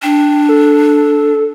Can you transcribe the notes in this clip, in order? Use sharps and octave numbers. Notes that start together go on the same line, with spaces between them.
D4 G5
A4